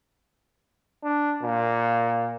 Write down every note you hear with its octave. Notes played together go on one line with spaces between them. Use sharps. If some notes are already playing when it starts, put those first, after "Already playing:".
D4
A#2